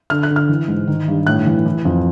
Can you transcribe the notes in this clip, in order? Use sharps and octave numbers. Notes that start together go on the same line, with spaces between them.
D3 F6
F#6
D3
F6
E3
G#2
D#3
G2
A2 F#6
E3
E3
F2